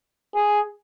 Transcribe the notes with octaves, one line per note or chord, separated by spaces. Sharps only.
G#4